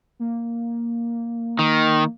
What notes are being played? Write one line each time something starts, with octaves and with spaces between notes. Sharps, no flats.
A#3
D#3